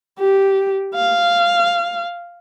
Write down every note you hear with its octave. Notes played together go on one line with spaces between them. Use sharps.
G4
F5